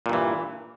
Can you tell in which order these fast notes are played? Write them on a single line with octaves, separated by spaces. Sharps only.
A#2 G2 E3